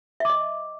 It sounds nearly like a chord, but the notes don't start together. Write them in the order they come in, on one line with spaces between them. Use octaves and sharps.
E5 D6 D#5